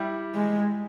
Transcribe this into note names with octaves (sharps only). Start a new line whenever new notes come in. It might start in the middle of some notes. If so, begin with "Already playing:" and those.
Already playing: G3 E4
G#3